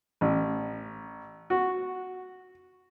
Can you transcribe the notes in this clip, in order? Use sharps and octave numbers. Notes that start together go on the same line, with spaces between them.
A1
F#4